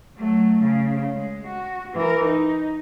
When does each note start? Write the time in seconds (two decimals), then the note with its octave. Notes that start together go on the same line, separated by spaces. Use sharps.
0.18 F#3 A3
0.63 C#3
1.14 G#3
1.48 F#4
1.95 E3 A#4
2.24 D#4